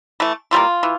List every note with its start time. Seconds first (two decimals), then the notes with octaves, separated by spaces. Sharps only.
0.20 E3 A3
0.51 E3 G3 A#3 F4
0.83 E3